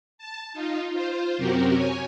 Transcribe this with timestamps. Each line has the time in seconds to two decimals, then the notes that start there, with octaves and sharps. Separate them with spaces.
0.18 A5
0.53 D#4 F4
0.91 F4 C5
1.38 F#2 C3 C4 F#4 G4 A#4
1.73 C#5 G#5